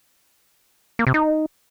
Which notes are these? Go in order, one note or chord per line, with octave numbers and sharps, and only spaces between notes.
A#3
C3
D#4